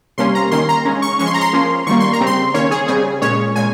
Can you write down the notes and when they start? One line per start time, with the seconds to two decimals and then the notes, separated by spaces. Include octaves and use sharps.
0.18 C3 G3 A#3 C#4 C6
0.35 A#5
0.51 D#3 A#3 C#4 C6
0.69 A#5
0.85 C#3 G#3 C#4
1.02 C#6
1.18 F3 G#3 C#4 C#6
1.27 C6
1.34 A#5
1.41 C6
1.53 F3 A#3 C#4
1.87 D#3 G3 A#3 C#6
2.00 C6
2.13 A#5
2.20 C#3 G3 C4
2.26 C6
2.54 D#3 A#3 C#4 C#5
2.71 G#4
2.88 C#3 G3 C4 G#4
3.22 A#2 G#3 C#4 C#5
3.55 A#2 G#3 C#4 G#5